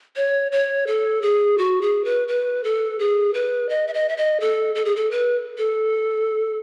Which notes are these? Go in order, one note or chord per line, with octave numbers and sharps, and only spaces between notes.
C#5
C#5
A4
G#4
F#4
G#4
B4
B4
A4
G#4
B4
D#5
E5
D#5
E5
D#5
A4
A4
G#4
A4
B4
A4